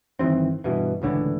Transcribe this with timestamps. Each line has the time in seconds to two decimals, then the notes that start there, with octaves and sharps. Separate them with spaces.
0.19 G1 D#3 E3 C4
0.64 G2 B2 E3
1.02 C#2 A2 D3 E3